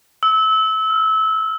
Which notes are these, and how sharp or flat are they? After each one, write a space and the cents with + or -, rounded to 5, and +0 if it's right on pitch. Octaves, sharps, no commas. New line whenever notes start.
E6 -25
E6 +45